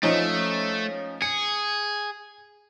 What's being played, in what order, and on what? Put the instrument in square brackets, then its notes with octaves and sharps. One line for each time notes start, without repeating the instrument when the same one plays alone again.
[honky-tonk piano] F3 C#4 D#4 [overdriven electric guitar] A3
[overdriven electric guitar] G#4 [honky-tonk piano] C#7